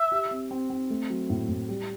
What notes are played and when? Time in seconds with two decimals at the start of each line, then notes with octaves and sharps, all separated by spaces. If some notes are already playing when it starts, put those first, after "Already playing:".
Already playing: E5
0.12 G4
0.31 C4
0.51 C4
0.70 C4
0.90 A3
1.10 F#3
1.30 A2
1.49 A2
1.69 G3